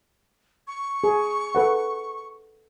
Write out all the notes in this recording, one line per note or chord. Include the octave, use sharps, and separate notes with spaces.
C#6
G#4
A4 B4 F#5